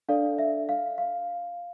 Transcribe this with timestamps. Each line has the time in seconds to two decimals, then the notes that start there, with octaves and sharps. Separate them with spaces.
0.09 D4 A4 D5 F5
0.39 E5
0.69 F5
0.98 F5